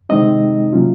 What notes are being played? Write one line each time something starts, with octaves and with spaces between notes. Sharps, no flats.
C3 D#3 G#3 C4 D#4 D#5
C3 F#3 A#3 C#4 F4